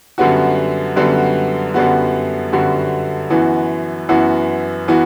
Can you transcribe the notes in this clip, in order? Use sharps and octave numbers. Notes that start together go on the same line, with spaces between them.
F#2 D3 G3 B3 F#4
F#2 D3 G3 B3 F#4
F#2 D3 G3 B3 F#4
F#2 D3 G3 B3 F#4
F#2 E3 B3 F#4
F#2 E3 B3 F#4
E3 B3 F#4